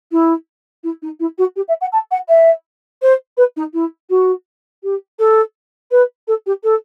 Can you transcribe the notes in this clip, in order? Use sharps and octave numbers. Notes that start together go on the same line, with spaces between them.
E4
E4
D#4
E4
F#4
G4
E5
F#5
A5
F#5
E5
C5
B4
D#4
E4
F#4
G4
A4
B4
A4
G4
A4